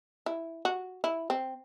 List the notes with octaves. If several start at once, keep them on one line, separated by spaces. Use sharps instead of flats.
E4
F#4
E4
C4